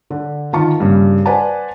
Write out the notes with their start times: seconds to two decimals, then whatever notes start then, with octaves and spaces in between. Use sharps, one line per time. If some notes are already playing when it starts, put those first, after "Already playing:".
0.10 D3
0.53 D#3 F4 A5 C#6
0.80 G2 C#3 G3 A#3
1.26 B4 C5 D5 F#5 G#5 A5